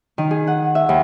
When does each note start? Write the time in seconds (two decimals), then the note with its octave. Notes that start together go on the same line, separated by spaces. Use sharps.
0.18 D#3
0.31 G#4
0.47 F#5
0.75 E5
0.89 D#2